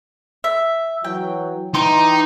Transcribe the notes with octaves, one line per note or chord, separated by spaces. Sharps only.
E5
E3 F#3 G5
E3 D#4 G5 A#5 C6 D6